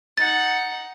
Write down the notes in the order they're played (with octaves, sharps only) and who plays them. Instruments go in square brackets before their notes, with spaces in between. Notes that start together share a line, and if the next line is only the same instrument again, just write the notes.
[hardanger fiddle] D#4 F#5 [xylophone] A6